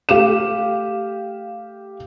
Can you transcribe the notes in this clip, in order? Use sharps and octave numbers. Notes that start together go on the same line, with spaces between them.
A3 G4 F5 D6 E7